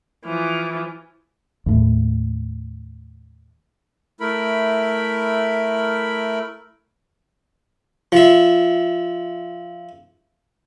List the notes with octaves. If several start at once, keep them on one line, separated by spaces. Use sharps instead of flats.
E3 F3
D#2 A2
A3 E4 A#4 B5
F3 E5